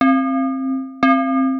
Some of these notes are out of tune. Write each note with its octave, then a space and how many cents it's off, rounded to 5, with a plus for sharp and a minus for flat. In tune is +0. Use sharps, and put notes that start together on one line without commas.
C4 +20
C4 +15